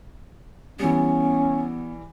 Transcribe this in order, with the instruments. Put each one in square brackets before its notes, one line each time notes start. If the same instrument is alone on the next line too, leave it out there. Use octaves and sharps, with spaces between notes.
[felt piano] E3 G3 [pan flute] B3 [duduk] C#4